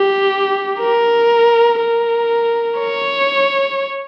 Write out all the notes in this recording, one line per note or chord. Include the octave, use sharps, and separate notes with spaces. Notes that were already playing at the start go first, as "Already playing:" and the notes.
Already playing: G4
A#4
A#4
C#5